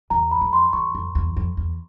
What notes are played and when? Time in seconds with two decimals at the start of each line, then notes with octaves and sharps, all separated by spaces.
0.10 E2 A#5
0.31 B5
0.41 F2
0.53 C6
0.73 E2 C#6
0.95 F2
1.15 E2
1.36 F2
1.57 E2